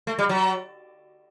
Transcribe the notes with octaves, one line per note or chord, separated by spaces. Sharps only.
A3
G3
F#3